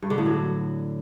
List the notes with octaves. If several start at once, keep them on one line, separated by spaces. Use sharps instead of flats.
G2
D3
A2
F#3